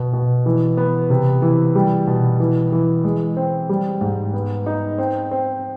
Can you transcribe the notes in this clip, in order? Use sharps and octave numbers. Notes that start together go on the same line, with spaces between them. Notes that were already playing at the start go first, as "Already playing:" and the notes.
Already playing: B2
B2
E3
B3
C3
E3
G3
B2
E3
E3
G#3
C4
G3
G#2
B3
D#4
C4
C4